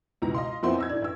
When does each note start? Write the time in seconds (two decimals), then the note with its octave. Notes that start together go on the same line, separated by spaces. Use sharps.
0.22 C#2 B2 E3 A#5
0.35 D#5 F5 C6
0.63 F2 A#2 B3 C4 E4 C6
0.78 D#5 E6 G#6
0.89 A2 D4
1.02 A1 E6